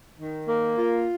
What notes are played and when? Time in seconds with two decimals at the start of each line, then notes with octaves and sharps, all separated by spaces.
0.19 D#3
0.48 A#3
0.77 F4